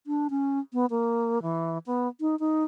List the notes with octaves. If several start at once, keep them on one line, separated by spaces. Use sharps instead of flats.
D4
C#4
B3
A#3
E3
B3
D#4
D#4